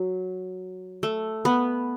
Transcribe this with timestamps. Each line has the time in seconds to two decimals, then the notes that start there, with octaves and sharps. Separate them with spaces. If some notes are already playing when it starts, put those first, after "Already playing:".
Already playing: F#3
1.03 A3
1.45 B3